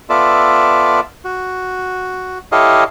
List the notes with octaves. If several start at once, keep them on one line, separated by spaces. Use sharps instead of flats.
B3 F4 A4 D5 E5
F#4
E4 G4 A4 C#5 D#5 F5